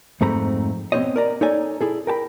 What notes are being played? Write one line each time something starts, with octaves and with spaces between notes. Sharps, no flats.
F2 G#2 A3 C4 A#5 B5
B3 C4 F4 C5 C#5 D#5
A#4 D5 A#5
D#4 A4 C#5 D5 G#5
E4 G#4 A4
A#4 G5 A5 B5